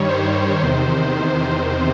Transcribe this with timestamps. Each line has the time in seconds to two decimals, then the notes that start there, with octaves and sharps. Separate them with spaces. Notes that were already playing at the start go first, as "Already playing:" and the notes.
Already playing: G2 D#3 G3 C#5
0.08 C5
0.60 E2 C3 D#3